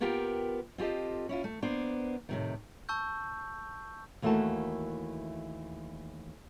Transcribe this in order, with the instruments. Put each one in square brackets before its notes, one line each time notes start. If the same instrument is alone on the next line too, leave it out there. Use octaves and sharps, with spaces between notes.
[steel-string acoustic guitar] A#3 B3 F4 G4 A#4 G5
C4 F4 G4 A4 D#5
C#4 E4 F4
A3
A#3 B3 D4 C5
A2 C3 D#3
[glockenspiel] A5 C#6 E6 G6
[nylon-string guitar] D#2 E3 A3 A#3 F#4 A5